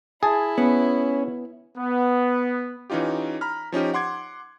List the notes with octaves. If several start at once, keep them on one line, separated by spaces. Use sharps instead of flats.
E4 G#4 A5
B3 C#4
B3
E3 C#4 D#4 F4 G4
A#5 B5 F6
F3 C#4 D#4 G4
F#5 C6 D6 G#6